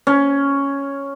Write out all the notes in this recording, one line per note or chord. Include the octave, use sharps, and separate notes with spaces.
C#4